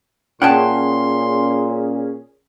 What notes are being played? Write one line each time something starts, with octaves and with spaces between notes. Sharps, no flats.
A#2 C#4 G#4 F#5 G5 A5 C6